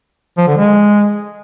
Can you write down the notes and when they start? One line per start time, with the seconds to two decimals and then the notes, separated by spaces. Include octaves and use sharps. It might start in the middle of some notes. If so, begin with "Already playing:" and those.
0.38 F3
0.48 D3
0.58 G#3